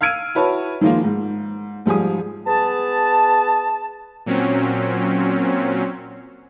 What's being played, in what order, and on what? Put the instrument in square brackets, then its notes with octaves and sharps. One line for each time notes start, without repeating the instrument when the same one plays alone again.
[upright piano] F5 E6 F6 G#6 D7 D#7
E4 F#4 B4 C#5 A5
D#3 F3 G#3 A#3 F4
G#2
G#2 F3 G3 G#4 D#6
[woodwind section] B3 G#4 A5
[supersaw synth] A#2 F#3 C4 C#4